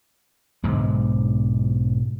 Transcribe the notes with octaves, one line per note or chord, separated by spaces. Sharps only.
B1 G#2 D3 G#3